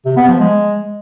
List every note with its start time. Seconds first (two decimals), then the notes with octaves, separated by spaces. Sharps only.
0.05 C3
0.17 B3
0.28 F3
0.40 G#3